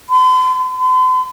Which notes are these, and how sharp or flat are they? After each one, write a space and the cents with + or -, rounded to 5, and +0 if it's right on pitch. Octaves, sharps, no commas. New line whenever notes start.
C6 -45
C6 -45